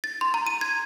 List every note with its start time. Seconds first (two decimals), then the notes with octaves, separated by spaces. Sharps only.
0.04 A6
0.21 C6
0.34 A#5
0.47 D#7
0.61 G#6